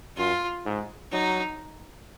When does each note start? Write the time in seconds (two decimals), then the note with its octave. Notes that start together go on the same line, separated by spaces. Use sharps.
0.17 F#2 F4
0.65 G#2
1.12 F#3 D#4